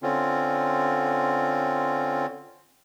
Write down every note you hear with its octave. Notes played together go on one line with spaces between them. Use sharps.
D3 C4 C#4 F4